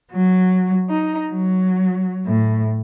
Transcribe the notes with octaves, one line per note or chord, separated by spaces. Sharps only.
F#3
D#4
F#3
A2